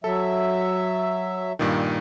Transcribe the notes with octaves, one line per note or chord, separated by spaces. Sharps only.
F#3 A4 E5
G2 A#2 D#3